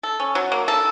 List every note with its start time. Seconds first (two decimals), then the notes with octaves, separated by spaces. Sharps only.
0.03 A4
0.20 C#4
0.35 F#3
0.52 A#3
0.68 A4